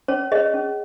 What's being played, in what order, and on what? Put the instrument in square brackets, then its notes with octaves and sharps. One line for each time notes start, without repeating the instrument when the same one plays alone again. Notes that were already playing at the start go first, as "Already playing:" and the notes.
[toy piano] C#4 C#5
G#4 C#5 D#5
C#4